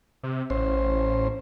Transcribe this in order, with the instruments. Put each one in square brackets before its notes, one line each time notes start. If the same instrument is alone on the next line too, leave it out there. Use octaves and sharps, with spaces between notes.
[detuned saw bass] C3
[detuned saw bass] A1 [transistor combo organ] C#4 C5